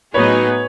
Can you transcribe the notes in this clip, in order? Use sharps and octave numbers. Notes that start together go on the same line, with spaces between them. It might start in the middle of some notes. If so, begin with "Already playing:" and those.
A2 F#3 B3 D#4 G#4 B4 C#5